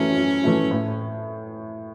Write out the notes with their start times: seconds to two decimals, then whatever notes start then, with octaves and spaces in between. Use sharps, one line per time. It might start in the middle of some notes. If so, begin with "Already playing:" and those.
Already playing: F#2 E3 A3 C#4 E4
0.16 F#2
0.43 E3 A3 E4
0.71 A2